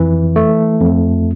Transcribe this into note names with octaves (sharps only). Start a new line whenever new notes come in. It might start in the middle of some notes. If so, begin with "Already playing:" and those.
Already playing: F2 E3
A3
F2